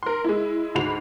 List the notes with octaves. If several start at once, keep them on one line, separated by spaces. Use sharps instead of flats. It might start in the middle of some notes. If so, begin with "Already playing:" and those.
A#4 C6
G#3 E4
D2 G#2 F#4 B5 C7 F7